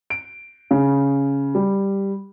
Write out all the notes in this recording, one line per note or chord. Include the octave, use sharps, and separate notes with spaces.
D7
C#3
G3